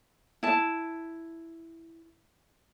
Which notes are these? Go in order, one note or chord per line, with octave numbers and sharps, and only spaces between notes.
E4 A5